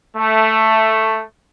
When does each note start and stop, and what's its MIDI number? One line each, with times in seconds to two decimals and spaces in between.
0.16 1.23 57